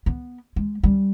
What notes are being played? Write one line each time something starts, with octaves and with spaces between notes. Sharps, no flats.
B3
G#3
G3 C#4